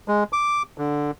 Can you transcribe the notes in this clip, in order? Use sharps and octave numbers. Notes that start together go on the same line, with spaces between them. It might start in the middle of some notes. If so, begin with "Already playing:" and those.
G#3
D6
D3